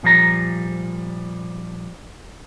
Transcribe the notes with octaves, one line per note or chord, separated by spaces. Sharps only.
A#2 F3 G3 A#5